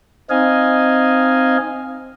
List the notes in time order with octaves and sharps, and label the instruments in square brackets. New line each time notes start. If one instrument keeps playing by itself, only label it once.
[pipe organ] C4 D#4 D#5 F5 G#5